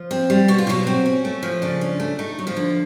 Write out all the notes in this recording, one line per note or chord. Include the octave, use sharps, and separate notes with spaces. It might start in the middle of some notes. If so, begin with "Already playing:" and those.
Already playing: F3 F4
C4
G3
B2 F#4
F4
B2 F#3 F#4
C4
C#4
A3
F3
C#3 D4
C#4
A3
A3 D#4
F#3
F3 F4
D3